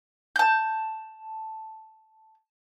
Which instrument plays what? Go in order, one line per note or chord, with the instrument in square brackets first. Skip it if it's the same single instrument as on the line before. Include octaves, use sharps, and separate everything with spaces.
[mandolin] A5 G6